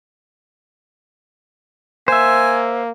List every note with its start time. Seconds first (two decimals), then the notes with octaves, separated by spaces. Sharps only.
2.08 A#3 C5 E5 G#5